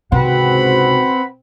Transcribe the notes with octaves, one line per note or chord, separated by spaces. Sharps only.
G#1 C#2 C3 C4 F#4 B4 F#5 B5